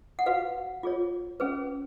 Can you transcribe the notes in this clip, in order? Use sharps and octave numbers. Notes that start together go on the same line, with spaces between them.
F#5
F#4 B4 F5
F4 G#4 C#5
C#4 G#4 B4